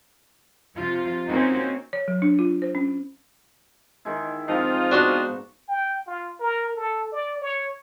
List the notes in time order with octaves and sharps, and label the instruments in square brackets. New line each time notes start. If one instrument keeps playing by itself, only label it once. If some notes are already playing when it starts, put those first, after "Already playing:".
[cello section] C3 F3 F4
A#3 C4 C#4 D#4 F#4
[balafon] C#5
F#3
D4
F4
C5
C#4
[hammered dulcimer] D#3 G#3 E4
[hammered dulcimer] G#2 F3 [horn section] C4 D#4 F4
[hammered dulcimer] B3 C#6 [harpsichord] D4 F#4 C6
[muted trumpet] G5
F4
A#4
A4
D5
C#5